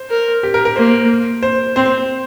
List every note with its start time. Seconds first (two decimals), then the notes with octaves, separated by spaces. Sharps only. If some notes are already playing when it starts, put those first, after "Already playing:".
Already playing: C5
0.10 A#4
0.43 G4
0.54 A#4
0.65 A#4
0.76 A#3 C5
1.43 C5
1.76 C4 C5